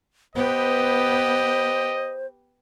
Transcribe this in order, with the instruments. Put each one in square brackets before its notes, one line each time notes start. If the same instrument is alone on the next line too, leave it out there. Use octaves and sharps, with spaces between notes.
[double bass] B3 [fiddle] G4 B4 [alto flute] C5 [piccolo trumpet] D#5